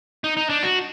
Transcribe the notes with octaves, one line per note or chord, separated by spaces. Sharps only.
D#4
D#4
D4
F#4